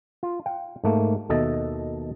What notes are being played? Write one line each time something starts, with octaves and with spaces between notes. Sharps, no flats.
F4
F5 G5
G#2 A3 A#3
D#2 B2 A4 D#5 E5 A5